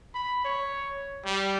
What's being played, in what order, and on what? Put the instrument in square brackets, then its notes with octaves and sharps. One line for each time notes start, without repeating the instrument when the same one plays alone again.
[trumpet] B5
C#5
G3